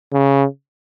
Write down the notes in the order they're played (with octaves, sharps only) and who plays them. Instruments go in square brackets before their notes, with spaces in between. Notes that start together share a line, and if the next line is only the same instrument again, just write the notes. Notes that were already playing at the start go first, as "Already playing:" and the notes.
[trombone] C#3